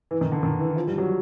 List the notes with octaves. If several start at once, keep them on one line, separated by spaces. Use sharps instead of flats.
E3
D#3
D3
D#3
E3
F3
G3
F#3